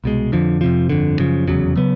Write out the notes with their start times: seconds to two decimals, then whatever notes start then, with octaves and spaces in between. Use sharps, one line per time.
0.04 C2 B2 G#3
0.32 F2 D3 F3
0.61 F2 C3 F3
0.90 G1 F2 D3
1.19 F#2 C#3 F3
1.48 F1 E2 C#3 F#3
1.76 C#3 F#3 B3